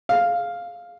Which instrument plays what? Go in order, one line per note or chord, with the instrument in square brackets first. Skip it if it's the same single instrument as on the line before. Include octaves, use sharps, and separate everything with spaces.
[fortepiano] F5